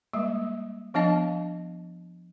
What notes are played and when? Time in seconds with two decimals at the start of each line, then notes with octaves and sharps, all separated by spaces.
0.13 G3 G#3 A#3
0.94 F3 B3 D4 D#5 F5 A5